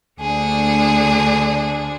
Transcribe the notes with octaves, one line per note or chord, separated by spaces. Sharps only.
D2 D3 A3 D4 G#4